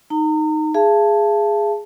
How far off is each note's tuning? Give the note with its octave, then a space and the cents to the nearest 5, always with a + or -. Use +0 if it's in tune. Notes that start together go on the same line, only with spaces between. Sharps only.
D#4 +0 A#5 -35
G#4 +0 F5 -45 A5 +0